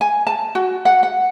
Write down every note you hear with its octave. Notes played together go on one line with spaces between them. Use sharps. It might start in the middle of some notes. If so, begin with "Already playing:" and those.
G#5
A5
F#4
F#5
F#5